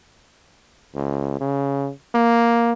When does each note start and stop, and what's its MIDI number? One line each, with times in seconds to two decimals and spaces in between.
0.95 1.38 37
1.41 1.90 49
2.15 2.73 58